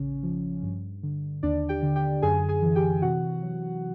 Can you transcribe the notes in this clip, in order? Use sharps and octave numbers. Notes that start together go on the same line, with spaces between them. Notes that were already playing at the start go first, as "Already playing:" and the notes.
Already playing: A1 C#3 C#4
F3
G2
D3
D#2 D4 D5
G4 G5
D3
G4 G5
F#2 G#4 G#5
G#4 G#5
E3
G4 G5
C3 F#4 F#5
F#3